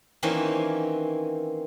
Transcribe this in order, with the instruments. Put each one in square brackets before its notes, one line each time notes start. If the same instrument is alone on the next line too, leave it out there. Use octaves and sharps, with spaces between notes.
[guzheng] D#3 E3 A#3 C4 C#4